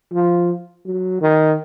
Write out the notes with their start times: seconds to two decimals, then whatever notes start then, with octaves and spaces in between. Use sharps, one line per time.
0.13 F3
0.86 F#3
1.21 D#3